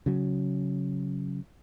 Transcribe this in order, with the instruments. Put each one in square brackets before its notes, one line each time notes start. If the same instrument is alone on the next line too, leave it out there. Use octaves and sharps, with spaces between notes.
[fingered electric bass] C#3 F#3